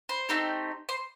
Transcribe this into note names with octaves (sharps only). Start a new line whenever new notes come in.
C5
A3 C4 D#4 G4
C5